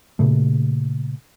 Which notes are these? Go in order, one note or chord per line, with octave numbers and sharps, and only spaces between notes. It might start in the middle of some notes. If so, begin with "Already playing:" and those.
A#2 C#3 A3